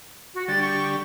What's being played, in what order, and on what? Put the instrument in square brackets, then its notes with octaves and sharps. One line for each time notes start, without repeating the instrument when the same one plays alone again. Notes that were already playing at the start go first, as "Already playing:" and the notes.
[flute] F#4
[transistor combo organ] D3 G3 [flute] A6
[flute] C#6